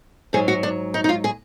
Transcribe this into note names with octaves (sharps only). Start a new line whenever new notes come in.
G#2 F#3 G#4
F#4
D4
D#4
D#4
F4
G#4